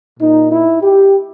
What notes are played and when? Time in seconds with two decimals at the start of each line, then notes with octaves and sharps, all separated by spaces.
0.20 A#2 D#4
0.51 E4
0.83 G4